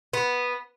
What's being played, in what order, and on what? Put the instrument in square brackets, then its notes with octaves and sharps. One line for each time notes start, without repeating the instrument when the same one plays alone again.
[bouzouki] B3